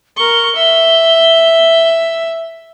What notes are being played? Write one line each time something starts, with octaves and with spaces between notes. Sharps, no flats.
A#4 C#6 G7
E5